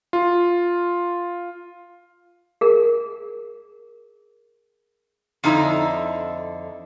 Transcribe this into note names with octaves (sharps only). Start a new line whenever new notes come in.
F4
G#4 A#4
F2 D3 D#4 E4